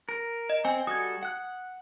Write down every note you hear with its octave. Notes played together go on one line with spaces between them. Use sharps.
A#4
D#5
C4 G#5
G3 F#4 A4 D#6 G#6
F#5 F#6